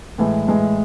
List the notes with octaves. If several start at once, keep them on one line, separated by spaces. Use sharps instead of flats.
A2 E3 G#3
A2 E3 G#3